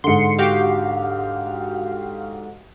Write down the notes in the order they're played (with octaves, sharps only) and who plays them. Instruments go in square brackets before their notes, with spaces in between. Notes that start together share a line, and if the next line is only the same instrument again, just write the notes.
[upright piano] G#2 D3 [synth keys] C6 C#7
[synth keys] F#4 G4 F5